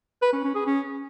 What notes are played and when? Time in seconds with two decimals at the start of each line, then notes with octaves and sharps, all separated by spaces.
0.22 B4
0.33 C#4
0.44 C#4
0.55 G#4
0.66 C#4